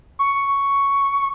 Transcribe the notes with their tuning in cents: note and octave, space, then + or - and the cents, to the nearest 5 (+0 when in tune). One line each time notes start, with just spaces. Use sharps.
C#6 +5